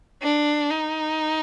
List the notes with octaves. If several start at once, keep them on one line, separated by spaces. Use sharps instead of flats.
D4
D#4